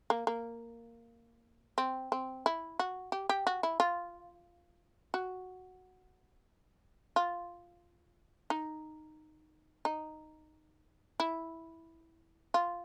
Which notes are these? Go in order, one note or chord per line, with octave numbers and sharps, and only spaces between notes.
A#3
A#3
C4
C4
E4
F#4
G4
G4
F#4
E4
F4
F#4
F4
D#4
D#4
E4
F4